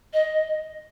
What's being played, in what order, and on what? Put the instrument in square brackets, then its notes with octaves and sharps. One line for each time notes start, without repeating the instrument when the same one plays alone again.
[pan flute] D#5